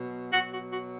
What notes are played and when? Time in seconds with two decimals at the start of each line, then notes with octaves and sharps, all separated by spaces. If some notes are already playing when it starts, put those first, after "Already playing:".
Already playing: B2 F#3
0.32 B2 F#3 F#4
0.53 F#4
0.73 F#4